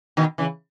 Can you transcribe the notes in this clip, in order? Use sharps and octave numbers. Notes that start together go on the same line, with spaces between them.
B2 D#3
C#3 E3